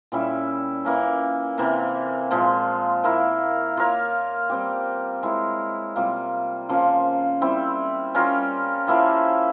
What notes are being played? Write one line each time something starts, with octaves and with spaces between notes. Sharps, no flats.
A#2 G3 C#4 E4
E3 A#3 C#4
C3 E3 A#3
A#2 F3 G#3
A#3 E4 A#4
A#3 F4 A#4 C#5
G3 C4 G4
G#3 E4 A#4 C#5
C3 G3 A#3 F4
C#3 F3 A#3 F4
G3 C4 E4
G3 C#4 F4 A#4
F3 A#3 E4 G4